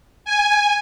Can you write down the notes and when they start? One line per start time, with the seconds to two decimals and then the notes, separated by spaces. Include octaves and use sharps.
0.25 G#5